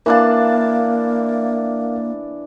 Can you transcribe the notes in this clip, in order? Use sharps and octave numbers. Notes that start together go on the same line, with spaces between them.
E3 A#3 D4 A#4 F5 A5